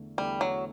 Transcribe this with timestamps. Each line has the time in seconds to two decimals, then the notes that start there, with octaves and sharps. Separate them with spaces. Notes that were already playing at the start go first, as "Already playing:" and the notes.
Already playing: E2 D3 A3
0.18 E2 D3 G3 A3
0.41 F#3